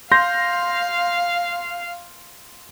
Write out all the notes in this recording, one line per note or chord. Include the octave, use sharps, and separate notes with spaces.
F5 C6 G6 A#6